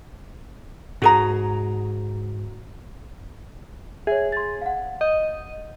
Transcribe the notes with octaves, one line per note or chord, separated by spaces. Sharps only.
G#2 F#4 G#4 A#5
G#4 C#5 E5
C6 A6
F5 F#5
D#5 G6